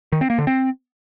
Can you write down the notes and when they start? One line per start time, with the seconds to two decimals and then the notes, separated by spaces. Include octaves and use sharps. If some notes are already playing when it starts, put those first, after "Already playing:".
0.12 D#3
0.21 C4
0.30 A#3
0.38 D3
0.47 C4